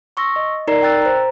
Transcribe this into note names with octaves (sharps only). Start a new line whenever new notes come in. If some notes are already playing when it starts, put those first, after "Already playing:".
C6 C#6 E6 A#6
D#5
D#4 A#4 D5 A#5 C7
G5 A#5 E6 F#6 A6
C5 A#5